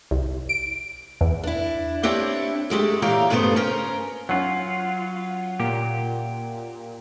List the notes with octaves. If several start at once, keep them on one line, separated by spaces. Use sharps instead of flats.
C2
D7
E2
D4 E4
C4 D4 E4 G4 C#5
F#2 G#3 A3 G4
A#2 E3 G4 C#5 F5 A#5
G2 C#3 A3 B3 C5
C#4 A#4 C5
F#3 C#4 F4 F#5
A#2 G4